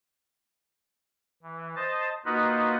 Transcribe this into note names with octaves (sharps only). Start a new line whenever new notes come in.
E3
C5 D#5 A5
A#3 D#4 F4 F#4 B4 D#5